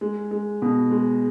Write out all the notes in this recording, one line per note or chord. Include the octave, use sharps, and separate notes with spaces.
G#3
G#3
B2
G#3